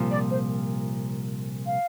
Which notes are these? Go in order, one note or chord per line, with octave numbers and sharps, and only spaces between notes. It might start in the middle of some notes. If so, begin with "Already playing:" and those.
Already playing: C2 A#2 F3
D5
C5
F5